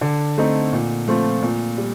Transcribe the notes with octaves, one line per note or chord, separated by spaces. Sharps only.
D3
A3 C4 D#4
A#2
F3 A3 C4 F4
A#2
G3